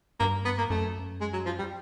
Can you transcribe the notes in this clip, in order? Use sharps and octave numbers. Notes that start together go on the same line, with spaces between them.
G2 A#3
B3
A#3
F#2 A3
G#3
F#3
F3
G3